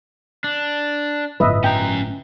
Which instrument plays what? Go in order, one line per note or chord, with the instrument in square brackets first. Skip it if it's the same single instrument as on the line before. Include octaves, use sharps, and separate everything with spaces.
[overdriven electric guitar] D4
[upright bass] G1 A2 [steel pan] B4 D#5 E5
[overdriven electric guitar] C#4 A#5 [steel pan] G5